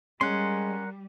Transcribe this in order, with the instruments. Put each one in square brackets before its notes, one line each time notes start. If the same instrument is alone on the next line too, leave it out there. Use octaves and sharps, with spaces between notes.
[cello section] G3 [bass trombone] G#3 [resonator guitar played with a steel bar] C#4 [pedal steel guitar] A#4 F#5 C6